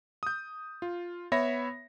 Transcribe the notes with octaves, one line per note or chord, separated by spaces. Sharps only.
D#6 G6
F4
B3 C#5 E5 B5 A#6